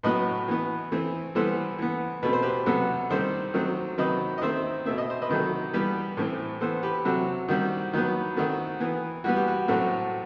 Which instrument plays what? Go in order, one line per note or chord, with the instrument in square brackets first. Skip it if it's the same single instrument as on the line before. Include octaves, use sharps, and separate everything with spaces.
[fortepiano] A2 F#3 B3 B4 D#5
E3 B3
E3 A3 C4
E3 G3 B3 A4 C5
E3 B3
B2 A3 C4 B4
C5
G4 B4
C3 F#3 B3 F#4 A4
D#3 G3 C4 A4 C5
D#3 F#3 A3 C4
C3 D#3 F#3 C4 B4 D#5
D#5
D#3 A3 C4 C5 E5
B2 A3 C4 E5
D#5
C5
B4 D#5
C3 D#3 F#3 A3
E3 G3 B3 G4 B4
A2 E3 A3 C4
E3 B3 A4 C5
G4 B4
C3 F#3 C4 F#4 A4
D#3 G3 C4 F#4
D#3 F#3 B3
D#3 A3 C4 F#4
E3 B3
E3 G3 B3 F#4
G4
F#4
A2 F#3 A3 C4 F#4